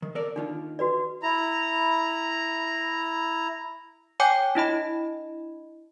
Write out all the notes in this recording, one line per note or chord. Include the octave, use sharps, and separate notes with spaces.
D#3
A4 A#4 D5
D#2 D#3 D4 F4
F#4 B4 D5
E4 A#5
C#5 G5 G#5 D6 G6 C7
D4 E4 D#5 B5